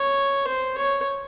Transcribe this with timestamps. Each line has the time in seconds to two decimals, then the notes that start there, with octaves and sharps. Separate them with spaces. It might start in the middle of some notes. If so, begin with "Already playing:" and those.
Already playing: C#5
0.47 C5
0.78 C#5